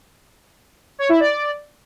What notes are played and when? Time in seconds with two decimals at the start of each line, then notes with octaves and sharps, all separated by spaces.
0.99 C#5
1.09 E4
1.20 D5